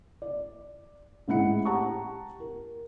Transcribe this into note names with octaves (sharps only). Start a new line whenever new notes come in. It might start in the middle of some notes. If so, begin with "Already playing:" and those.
D5
A1 G#2 E4 F#5 C#7
G4 F#5 A5 A#5 C#6
A#4